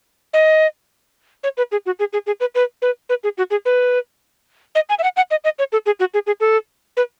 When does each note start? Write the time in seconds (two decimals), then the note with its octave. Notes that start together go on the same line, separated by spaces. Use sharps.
0.34 D#5
1.43 C#5
1.57 B4
1.72 G#4
1.86 F#4
1.99 G#4
2.13 G#4
2.27 G#4
2.40 B4
2.55 B4
2.82 B4
3.09 B4
3.24 G#4
3.38 F#4
3.51 G#4
3.65 B4
4.75 D#5
4.89 G#5
4.99 E5
5.03 F#5
5.17 F#5
5.31 D#5
5.44 D#5
5.59 C#5
5.72 A4
5.86 G#4
6.00 F#4
6.14 G#4
6.27 G#4
6.40 A4
6.97 B4